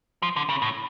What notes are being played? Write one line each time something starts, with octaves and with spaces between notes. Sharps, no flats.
F3
D3
C#3
A2